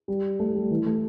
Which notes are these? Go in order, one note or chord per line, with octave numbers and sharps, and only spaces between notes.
G3
A3
G3
E3
A3